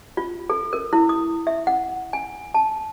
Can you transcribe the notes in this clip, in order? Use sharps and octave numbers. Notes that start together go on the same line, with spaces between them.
F4
A4
A#4
E4
D#6
E5
F#5
G#5
A5